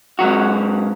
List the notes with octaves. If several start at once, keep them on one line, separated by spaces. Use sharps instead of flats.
G#2 F#3 F#4